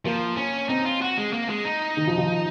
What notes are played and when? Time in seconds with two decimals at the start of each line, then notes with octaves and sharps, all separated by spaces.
0.05 F3 A#3
0.37 C#4
0.69 C4 D#4
0.85 F4
1.02 F#4
1.17 G#3
1.33 A#3
1.49 G#3
1.65 D#4
1.97 D#3
2.07 F3
2.18 F3